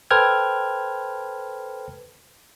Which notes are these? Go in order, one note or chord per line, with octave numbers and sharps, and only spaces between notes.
A4 B4 C5 G5 F6 G#6